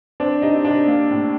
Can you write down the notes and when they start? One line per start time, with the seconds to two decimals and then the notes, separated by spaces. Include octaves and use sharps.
0.20 C4 D4
0.42 C3 D#4
0.65 C3 D4
0.87 A#3
1.10 A2